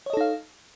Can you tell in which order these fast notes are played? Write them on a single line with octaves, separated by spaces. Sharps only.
C#5 D#5 A4 D#4 F5